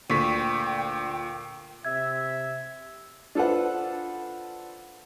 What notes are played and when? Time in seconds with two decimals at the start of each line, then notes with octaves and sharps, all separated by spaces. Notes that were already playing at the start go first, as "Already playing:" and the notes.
0.10 D2 A#2 G5 C#6 B6
1.85 C3 E5 G#6
3.35 D4 F4 A4 B4 C5 F#5